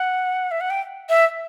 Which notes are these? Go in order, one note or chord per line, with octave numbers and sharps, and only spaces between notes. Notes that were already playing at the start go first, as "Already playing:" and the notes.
Already playing: F#5
E5
F#5
G5
E5